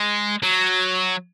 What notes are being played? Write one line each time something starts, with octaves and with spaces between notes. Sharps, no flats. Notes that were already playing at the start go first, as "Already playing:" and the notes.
Already playing: G#3
F#3